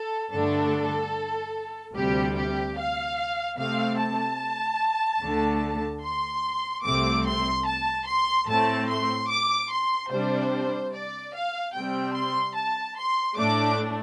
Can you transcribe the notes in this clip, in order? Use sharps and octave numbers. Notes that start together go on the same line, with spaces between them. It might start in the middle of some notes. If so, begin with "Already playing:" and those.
Already playing: A4
G2 D3 A3 D4 A4
D2 C3 G3 G4
G4
F5
C3 A3 C4 F5
A5
D2 D3 A3
C6
C2 C3 A3 C4 D6
C6
A5
C6
A2 A3 C4 A5
C6
D6
C6
C3 G3 D4 C5
D5
F5
C3 G3 C4 G5
C6
A5
C6
A2 A3 D4 D6